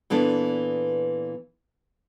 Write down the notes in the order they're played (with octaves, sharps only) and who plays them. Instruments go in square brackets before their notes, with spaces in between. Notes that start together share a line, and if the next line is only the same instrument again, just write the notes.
[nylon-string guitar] A#2 E3 B3 D4 A4